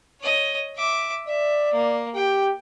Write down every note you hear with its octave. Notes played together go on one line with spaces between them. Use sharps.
C#5 D#5
E5 D6
D5 E5
A#3
G4 G5